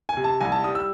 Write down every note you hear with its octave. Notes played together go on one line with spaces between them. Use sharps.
G#5
C3
A5
C2 G#5
A5
G3 D#6
E6